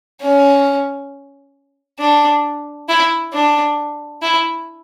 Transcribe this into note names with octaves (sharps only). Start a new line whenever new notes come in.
C#4
D4
E4
D4
E4